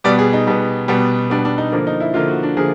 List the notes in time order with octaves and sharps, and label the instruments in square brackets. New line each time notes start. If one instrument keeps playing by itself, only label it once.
[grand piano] B2 G3 B3 D5
G#4
D#4
B2 G3 B3
B2 G3 B3
B2 G3 B3 D4
D4
D#4
D3 F3 A#3 D4
D#4
E4
D3 F3 A#3 F4
F#4
D4
D3 F3 A#3 G#4